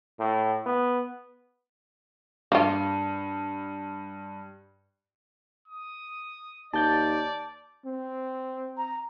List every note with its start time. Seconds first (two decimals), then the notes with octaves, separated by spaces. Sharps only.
0.19 A2
0.66 B3
2.52 G2 A#3 F4
5.68 D#6
6.73 D#2 D5 A5 G6 A6
7.86 C4
8.77 A#5